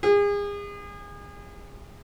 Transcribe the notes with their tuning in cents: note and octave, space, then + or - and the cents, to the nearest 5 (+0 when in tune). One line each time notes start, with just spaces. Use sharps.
G#4 -35